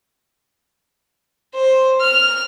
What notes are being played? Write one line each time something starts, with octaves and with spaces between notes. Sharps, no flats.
C5
F6